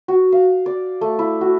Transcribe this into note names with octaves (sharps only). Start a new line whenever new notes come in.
F#4
F5
D5
A3
E4
F#4